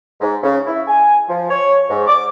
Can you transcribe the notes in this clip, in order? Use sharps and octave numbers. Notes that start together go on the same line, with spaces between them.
G#2
C#3
E4
G#5
F3
C#5
G#2
D6